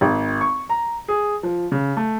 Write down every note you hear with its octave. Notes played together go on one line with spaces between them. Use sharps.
G#1
C#6
A#5
G#4
F3
C#3
A3